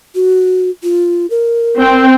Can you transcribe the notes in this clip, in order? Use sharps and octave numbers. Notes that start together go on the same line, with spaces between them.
F#4
F4
A#4
C4 G5